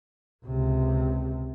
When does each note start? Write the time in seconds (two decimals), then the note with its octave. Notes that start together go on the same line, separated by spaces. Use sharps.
0.46 C#2 C3